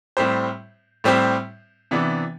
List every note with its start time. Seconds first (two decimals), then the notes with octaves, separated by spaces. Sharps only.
0.17 A2 G3 C4 G4 C5
1.04 A2 G3 C4 G4 C5
1.91 C3 E3 B3 D4